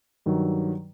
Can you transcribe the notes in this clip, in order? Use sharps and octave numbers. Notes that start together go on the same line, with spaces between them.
G2 D#3 F#3